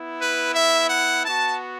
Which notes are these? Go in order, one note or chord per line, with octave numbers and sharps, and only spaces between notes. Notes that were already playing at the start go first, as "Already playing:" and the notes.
Already playing: B3 E4
B4
E5
F#5
B3 F#4 A5